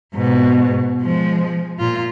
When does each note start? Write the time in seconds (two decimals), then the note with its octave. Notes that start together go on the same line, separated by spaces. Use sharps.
0.14 G#2 B2
1.01 F3 G#3
1.79 A#2 F4